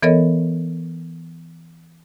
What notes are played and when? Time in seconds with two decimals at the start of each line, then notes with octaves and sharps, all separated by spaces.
0.03 E3 B3 A4 A#4 C#5 D#5